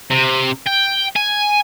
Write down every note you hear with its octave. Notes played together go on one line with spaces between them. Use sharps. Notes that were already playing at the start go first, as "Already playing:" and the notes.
C3
G5
G#5